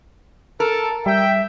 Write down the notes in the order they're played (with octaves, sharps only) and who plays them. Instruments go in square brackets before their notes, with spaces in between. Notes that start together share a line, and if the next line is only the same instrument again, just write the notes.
[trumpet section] A4 [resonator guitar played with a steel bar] A#4
[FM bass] G3 [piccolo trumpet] E5 [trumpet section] G5